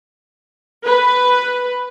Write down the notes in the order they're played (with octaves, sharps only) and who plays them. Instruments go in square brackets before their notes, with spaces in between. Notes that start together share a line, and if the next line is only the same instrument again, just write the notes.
[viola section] B4